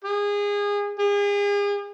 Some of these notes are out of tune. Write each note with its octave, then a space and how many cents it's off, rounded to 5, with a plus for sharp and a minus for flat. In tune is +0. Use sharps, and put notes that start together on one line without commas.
G#4 -25
G#4 -40